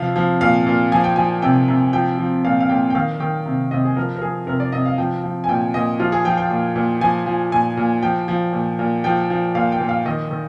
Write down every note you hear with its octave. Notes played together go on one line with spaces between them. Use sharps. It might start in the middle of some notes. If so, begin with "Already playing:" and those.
Already playing: C3 F3 F5
F3
A#2 F5
A#2
F3 G#5
G5
F3 G#5
C3 G5
C3
F3 G5
F3
A#2 F5
F5
A#2 G5
G5
D#3 F5
D#3 G5
C3
C3 D#5
G#4
F3 A#4
A#4
F3 G#4
C3 A#4
D5
C3 D#5
F5
F3 G5
F3
G#5
A#2 G5
A#2 D#5
F3 F4
G#4
F3 G5
G5
A#2
A#2
F3 G#5
F3
A#2 G#5
A#2
F3 G5
F3
A#2
A#2
F3 G5
F3
A#2 F5
G5
A#2
F5
D#3 D#5
D#3